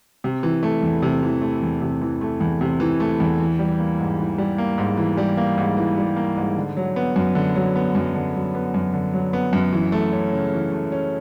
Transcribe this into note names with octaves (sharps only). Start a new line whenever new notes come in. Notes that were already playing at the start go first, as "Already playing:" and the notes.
C3
E3
A3
E2
C3
E3
A3
E2
C3
E3
A3
E2
C3
E3
A3
E2
E3
G3
A#3
G#2
E3
G3
A#3
G#2
E3
G3
A#3
G#2
E3
G3
A#3
G#2
D3
F#3
B3
F#2
D3
F#3
B3
F#2
D3
F#3
B3
F#2
D3
F#3
B3
F#2
E3
A3
C#4
C#3
E3
A3
C#4